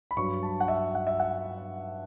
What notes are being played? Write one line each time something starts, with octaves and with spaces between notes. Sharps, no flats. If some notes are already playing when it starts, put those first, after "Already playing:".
B5
G2 F#3 C#6
A5
F#5
E5
F#5
E5
F#5